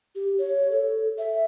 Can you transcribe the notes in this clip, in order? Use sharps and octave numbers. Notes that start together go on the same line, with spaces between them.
G4
C#5
A4
E5